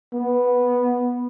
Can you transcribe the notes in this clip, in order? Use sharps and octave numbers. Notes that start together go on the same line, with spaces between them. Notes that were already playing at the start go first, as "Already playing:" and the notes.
B3